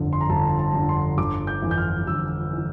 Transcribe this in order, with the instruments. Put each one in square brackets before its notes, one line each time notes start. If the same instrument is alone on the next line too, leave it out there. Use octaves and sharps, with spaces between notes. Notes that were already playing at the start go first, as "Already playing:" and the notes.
Already playing: [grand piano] G1 F2 D3
C6
A#5
G1 A5
A5
F2 D3
C6
G1 D6
G6
F2 E3
G6
F6
G1 E6
E3